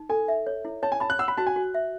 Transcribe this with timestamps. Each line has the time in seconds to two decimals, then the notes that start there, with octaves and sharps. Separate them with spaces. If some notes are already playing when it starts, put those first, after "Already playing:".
Already playing: D#4
0.09 A4 G#5
0.28 E5
0.47 C#5
0.65 E4
0.83 C#5 A5
0.92 G#5
1.00 A5 B5
1.10 F#6
1.19 F#5 E6
1.28 B5
1.37 F#4 A5
1.47 G#5
1.56 F#4
1.74 E5